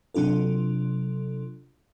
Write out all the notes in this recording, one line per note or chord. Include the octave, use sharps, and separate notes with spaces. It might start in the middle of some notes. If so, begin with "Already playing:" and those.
C3 F#3 D4 F4 A4